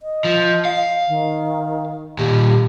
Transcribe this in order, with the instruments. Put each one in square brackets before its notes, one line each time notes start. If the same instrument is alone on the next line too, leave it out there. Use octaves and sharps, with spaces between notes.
[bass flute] D#5
[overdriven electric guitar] F3
F5
[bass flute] D#3
[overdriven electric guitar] A#2 D#3 [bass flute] G4